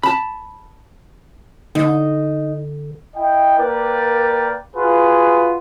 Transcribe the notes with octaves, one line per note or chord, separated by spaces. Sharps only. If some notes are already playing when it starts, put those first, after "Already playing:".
A5 B5
D3 D#4
E4 D#5 G5
A#3 A#4 B4 D5 G5
F4 F#4 G#4 B4